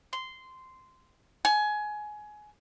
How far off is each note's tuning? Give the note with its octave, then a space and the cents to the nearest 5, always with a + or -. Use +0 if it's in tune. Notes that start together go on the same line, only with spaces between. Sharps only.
C6 -10
G#5 +20